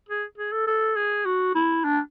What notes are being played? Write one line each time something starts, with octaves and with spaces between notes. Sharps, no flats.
G#4
G#4
A4
A4
G#4
F#4
E4
D4